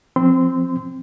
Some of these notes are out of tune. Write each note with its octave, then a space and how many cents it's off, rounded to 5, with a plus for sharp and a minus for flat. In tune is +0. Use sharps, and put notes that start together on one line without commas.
F3 +0 C4 +0 C6 -25